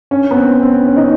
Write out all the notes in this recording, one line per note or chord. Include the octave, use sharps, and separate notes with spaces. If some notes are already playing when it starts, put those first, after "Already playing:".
C#4
B3
C4
C4
C#4
D#4